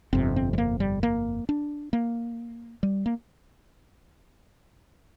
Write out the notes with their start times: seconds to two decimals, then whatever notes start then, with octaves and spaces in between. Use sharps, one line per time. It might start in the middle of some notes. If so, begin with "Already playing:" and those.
0.13 G1 F2 C3 C4
0.36 C4
0.53 G3
0.58 A#3
0.80 G3
1.03 A#3
1.49 D4
1.93 A#3
2.83 G3
3.06 A#3